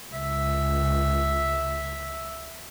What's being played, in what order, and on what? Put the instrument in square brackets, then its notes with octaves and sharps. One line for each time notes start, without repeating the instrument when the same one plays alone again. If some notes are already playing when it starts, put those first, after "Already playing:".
[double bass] C#2 [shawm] E5